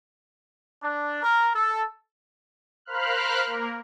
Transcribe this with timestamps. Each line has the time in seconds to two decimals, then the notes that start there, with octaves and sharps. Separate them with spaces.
0.82 D4
1.22 A#4
1.54 A4
2.85 A#4 C5 F5 B5 F6 F#6
3.46 A#3 A#4